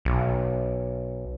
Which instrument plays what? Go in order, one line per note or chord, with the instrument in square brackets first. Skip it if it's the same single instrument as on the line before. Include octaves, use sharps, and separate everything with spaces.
[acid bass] B1